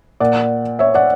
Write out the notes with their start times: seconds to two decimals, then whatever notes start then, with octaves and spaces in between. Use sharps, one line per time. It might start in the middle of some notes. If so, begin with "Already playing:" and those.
0.20 A#2 D5 F#5
0.79 C#5 E5
0.94 D5 F#5